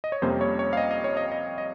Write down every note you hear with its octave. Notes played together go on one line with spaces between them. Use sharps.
D#5
C#5
F2 C3 G3 A#3 C#4 C5
C#5
C#5
F5
D#5
D#5
C#5
D#5
D#5
D#5